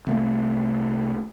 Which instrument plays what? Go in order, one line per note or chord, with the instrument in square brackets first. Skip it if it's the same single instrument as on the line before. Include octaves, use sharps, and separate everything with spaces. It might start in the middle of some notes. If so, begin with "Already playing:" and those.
[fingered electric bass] C2 A3 A#3